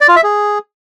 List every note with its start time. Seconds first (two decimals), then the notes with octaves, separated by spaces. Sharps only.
0.01 D5
0.08 F4
0.16 E5
0.23 G#4